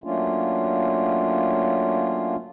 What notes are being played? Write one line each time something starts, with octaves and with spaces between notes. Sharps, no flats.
F#3 A3 A#3 C#4 D4 F4